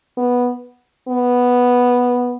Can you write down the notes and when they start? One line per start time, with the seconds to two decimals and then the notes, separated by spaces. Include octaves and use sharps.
0.17 B3
1.08 B3